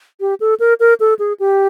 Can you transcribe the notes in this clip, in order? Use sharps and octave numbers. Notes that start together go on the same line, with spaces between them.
G4
A4
A#4
A#4
A4
G#4
G4